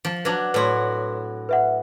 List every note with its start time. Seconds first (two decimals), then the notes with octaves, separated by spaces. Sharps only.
0.05 F3
0.25 F#3 D4 B4 A5
0.54 A2 F#4 B4 C#5 C6
1.49 B4 E5 F#5